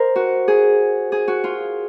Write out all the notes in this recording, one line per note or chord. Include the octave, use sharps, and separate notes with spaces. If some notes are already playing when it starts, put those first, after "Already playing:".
Already playing: A#4 C5 D#5
F#4
G#4
G#4
F#4
F4